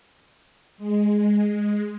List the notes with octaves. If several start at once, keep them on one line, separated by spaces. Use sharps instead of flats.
G#3